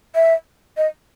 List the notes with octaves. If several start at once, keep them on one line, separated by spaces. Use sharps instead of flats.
E5
D#5